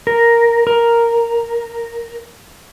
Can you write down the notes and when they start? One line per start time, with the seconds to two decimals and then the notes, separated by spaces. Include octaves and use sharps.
0.07 A#4
0.67 A#4